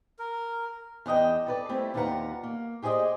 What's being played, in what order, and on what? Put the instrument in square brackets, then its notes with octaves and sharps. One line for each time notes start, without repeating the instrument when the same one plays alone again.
[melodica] A#4
[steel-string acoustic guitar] E2 D4 D#5 G5
A4 B4 D5
G3 A3 C4 E4
D#2 D4 F4 B4 F#5 A#5
A#3
G4 G#4 C5 D5 D#5